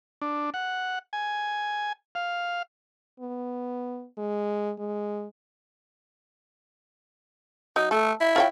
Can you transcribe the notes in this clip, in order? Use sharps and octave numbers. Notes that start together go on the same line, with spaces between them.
D4
F#5
G#5
F5
B3
G#3
G#3
F#3 D#4
A3 A4
E4
F4 C#5 G5